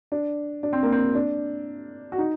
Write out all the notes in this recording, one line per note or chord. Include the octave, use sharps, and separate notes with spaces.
D4
D4
C4
A#3
C4
D4
F#4
D#4